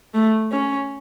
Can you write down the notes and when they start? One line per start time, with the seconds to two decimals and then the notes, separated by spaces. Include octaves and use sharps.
0.14 A3
0.52 C#4